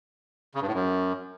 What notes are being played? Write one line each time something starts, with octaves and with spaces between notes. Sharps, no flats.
C#3
G2
A2
F#2